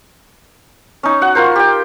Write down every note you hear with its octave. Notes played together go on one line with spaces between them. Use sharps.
C#4 D#4
F#4 F#5
F4 A#4 C5
G4 G5